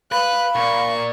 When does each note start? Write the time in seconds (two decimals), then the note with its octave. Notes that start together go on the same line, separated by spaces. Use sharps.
0.12 B4 F5 B5 F#6
0.55 A#2 C#6